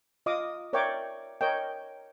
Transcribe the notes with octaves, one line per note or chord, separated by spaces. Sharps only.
F4 D#5 F5 D6 D#6
A#4 C#5 D5 E5 G5 D6
A#4 C#5 D#5 G5